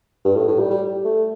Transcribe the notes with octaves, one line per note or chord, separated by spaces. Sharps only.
G2
A2
A2
G3
G3
A3